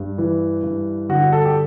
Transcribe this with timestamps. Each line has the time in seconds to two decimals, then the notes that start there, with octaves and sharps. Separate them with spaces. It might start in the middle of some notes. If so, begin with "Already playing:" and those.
Already playing: G2
0.18 E3
0.63 G2
1.09 D3 F#4
1.32 A4
1.46 G4